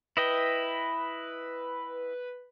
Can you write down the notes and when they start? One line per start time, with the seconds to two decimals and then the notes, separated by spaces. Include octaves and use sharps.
0.17 E4 B4 D#5 G5